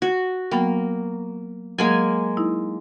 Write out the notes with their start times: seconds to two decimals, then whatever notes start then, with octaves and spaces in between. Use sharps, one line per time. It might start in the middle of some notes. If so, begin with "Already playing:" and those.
0.02 F#4
0.51 F#3 A#3 B3 G5
1.78 F#3 G#3 A#3 G#5
2.37 D#4 E4